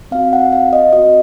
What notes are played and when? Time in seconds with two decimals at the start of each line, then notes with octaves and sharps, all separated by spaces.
0.11 C4 F#4 F5
0.33 F#5
0.53 F5
0.73 D#5
0.93 C4 F#4 D#5